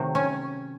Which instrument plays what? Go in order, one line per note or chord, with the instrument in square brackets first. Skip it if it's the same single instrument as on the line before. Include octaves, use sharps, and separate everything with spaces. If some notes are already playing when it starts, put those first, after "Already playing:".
Already playing: [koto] C3 D#3 F#3 A3
C#4